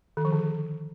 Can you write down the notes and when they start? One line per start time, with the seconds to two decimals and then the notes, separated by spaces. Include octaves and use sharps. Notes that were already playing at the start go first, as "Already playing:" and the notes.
0.17 D#3
0.25 F3
0.32 D3